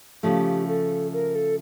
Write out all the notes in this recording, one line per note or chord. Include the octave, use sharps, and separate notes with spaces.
C#3 F3 A3 G4
A4
A#4
A4